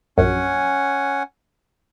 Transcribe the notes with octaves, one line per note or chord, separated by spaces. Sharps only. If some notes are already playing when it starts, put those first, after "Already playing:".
A#1 F#2 C#4 F#5 G#5